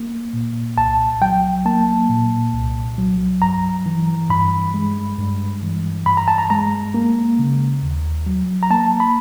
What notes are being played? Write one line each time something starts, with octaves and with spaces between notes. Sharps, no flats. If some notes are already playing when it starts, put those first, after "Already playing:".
Already playing: A#3
A#2
C2 A5
F#3 G5
A#3 A5
A#2
C2
F#3
G2 A#5
E3
G2 B5
G#3
G2
E3
G2 B5
A#5
A5
A#5
G#3 A#5
A#3
C#3
D#2
F#3
A#5
A#3 A5
B5